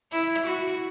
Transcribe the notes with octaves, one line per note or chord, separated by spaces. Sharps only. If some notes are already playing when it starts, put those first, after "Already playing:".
E4
F#4